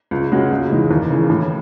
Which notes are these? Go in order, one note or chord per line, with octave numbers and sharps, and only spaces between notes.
C#2
C#3 G#3 C#4 F#4
C#2
C#3 E3 G#3 D#4
D#2
C#3 E3
A2